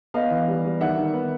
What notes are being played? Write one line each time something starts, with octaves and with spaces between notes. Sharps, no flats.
B3 D#5 F5
E3
G3
G3
D#3 E5 F#5
D#3
B3